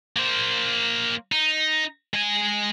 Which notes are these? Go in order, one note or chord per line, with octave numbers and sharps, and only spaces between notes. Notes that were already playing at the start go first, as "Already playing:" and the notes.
A#3 C5
D#4
G#3 G#5